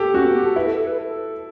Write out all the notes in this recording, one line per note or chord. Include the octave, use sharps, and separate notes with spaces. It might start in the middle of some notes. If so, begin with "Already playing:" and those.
Already playing: G4 A4
C#4 F#4
B3
G4
A4
E4 B4
A4
A4
B4
A4